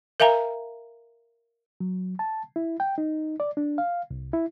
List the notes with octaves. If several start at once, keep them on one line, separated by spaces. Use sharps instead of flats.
A#4 E5 F5 G#5 A#5
F#3
A5
E4
G5
D#4
D5
D4
F5
C2
E4